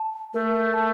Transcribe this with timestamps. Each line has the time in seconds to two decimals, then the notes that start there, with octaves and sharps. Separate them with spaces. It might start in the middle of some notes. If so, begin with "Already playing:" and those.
Already playing: A5
0.34 A3 A#4
0.74 A5